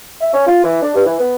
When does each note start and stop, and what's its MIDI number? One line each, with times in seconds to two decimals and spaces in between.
0.20 0.32 76
0.33 0.47 61
0.47 0.59 65
0.63 0.78 52
0.81 0.92 62
0.94 1.04 43
1.06 1.17 52
1.19 1.35 59